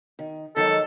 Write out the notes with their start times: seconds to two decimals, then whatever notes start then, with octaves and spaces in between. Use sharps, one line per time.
0.19 D#3
0.56 D#3 F#3 G#3 A4